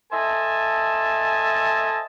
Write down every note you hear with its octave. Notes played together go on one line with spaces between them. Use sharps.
A4 C5 D#5 E5 G#5 A5